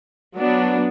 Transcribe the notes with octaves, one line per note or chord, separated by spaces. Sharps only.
F#3 B3 D4